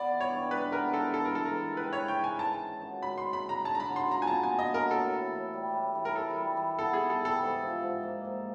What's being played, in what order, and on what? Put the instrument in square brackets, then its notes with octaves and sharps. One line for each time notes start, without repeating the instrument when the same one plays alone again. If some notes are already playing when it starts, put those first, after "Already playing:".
Already playing: [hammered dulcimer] B3 [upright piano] D5
[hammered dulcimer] E3
[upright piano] C#5
[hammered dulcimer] G2
[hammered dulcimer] G#3 [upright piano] B4
[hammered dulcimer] B3 [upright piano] A#4
[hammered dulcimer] E3 [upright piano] A4
[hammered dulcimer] E3 [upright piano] A4
[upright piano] A#4
[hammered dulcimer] G#3 [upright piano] A4
[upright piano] A#4
[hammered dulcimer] E3
[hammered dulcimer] C4 [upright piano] B4
[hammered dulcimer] E3 [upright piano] C#5
[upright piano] G5
[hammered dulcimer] G#3
[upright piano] G#5
[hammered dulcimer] C#4 [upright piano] A5
[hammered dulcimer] D#3
F#2
[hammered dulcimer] G#3 [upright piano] B5
[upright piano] C6
[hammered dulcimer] C#4
[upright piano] B5
[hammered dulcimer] D#3
[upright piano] A#5
[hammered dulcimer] D4 [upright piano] A5
[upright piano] A#5
B5
[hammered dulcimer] F#3
[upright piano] C6
[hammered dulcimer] A#2 [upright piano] A#5
[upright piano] G#5
[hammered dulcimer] B3 [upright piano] A5
[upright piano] G#5
[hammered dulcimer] D4
[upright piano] D#5
[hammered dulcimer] F#3 [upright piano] A#4
[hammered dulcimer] A2 [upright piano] A4
[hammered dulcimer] E3
A2
G3
A2
E3
[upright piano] A#4
[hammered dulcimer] E3 [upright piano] A4
[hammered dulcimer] G3
E3
[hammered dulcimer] B3 [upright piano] A4
[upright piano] G#4
[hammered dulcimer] E3
[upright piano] A4
[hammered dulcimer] G3
[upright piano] A4
[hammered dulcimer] G#2
F3
G#2
A#3
G#2